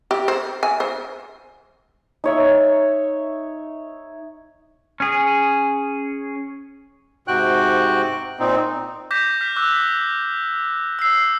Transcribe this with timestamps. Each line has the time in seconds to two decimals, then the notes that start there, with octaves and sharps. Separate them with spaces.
0.11 G4
0.28 C5
0.63 G#5
0.80 C5
2.24 D#4 C#5 E5
5.00 C#4 G#4
7.28 G#2 C3 F#4 G5 F#6
8.39 A#2 C4 D#4
9.11 D6 G6 A#6 B6 E7
9.41 F6 B6
9.56 D6 E6 F#6
10.99 E6 C7